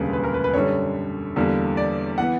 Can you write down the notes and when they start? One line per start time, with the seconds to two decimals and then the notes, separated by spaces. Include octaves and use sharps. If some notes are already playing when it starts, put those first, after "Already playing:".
Already playing: E1 D2 C#3 G3 A#3 B4
0.13 B4
0.24 A#4
0.34 B4
0.44 B4
0.54 F#2 D3 G3 C#5
1.36 E2 D3 G3 A#3
1.77 D5
2.18 E3 B3 F#5